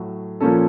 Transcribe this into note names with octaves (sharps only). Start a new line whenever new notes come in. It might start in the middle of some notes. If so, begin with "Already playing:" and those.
Already playing: A2 F#3 A3
A#2 F3 A#3 C#4 A4